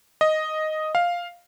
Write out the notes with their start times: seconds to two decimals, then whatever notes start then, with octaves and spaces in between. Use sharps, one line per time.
0.21 D#5
0.95 F5